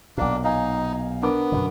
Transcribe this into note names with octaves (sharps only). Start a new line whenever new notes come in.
B1 A#2 A#3 D4
D#4 F5 G#5
B3 D4 A#4 D6
F#2 B2 D3